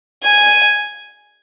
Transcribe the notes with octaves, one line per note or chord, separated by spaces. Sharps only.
G#5